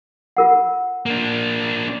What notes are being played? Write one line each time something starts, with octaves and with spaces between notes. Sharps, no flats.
F4 A#4 F#5
A#3 D4